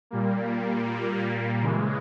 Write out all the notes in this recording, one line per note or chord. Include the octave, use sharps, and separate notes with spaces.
A#2 G3 A#3
C#3 E3 G#3